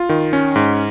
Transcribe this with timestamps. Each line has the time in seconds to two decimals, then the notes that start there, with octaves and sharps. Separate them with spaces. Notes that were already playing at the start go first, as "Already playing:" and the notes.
Already playing: F4
0.09 D#3
0.33 C#4
0.56 G#2